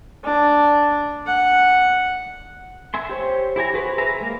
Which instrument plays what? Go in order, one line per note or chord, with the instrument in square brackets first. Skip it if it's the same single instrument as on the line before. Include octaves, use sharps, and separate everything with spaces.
[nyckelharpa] D4
F#5
[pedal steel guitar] E5 G#5 C6
G4 C5 C#5
E4 G4 G#5 A#5
F#4 G#4 B4 C5
G#4 B4 E5 A#5
G#3 A#3